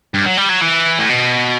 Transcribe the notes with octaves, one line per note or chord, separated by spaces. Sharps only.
G2
F#3
G3
F#3
E3
A2
B2